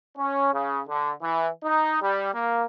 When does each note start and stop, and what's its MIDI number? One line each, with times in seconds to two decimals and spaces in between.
0.18 0.52 61
0.54 0.81 49
0.88 1.12 50
1.22 1.48 52
1.64 1.97 63
2.02 2.30 55
2.33 2.65 58